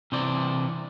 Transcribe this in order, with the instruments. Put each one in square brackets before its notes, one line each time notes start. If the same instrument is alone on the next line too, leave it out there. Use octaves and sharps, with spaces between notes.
[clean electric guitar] C3 E3 C5 D5